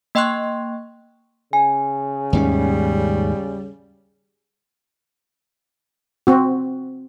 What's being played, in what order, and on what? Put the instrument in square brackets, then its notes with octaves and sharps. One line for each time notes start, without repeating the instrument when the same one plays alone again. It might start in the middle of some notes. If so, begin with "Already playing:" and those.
[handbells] A#3 D#5 G5 C6 C#6 F#6
[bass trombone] C#3 [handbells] G#5
[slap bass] D#2 G#2 C#4 [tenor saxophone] G3
[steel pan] C4 F#4